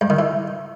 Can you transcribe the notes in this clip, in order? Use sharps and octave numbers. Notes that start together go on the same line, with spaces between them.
G2
D#3
E3